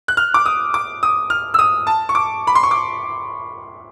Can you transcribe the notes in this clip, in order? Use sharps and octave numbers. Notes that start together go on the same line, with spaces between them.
F#6
F6
D6
D#6
D6
D#6
F6
E6
D#6
A5
C#6
D6
B5
C6
C#6
D6